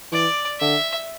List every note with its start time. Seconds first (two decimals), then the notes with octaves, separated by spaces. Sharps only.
0.12 E3 D5
0.60 D3 E5